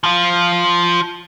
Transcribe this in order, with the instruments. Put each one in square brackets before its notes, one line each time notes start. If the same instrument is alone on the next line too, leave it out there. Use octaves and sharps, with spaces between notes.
[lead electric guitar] F3 F4